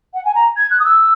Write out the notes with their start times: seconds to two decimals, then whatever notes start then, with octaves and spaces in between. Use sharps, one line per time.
0.14 F#5
0.25 G#5
0.35 A#5
0.57 G#6
0.71 F#6
0.79 D#6
0.85 E6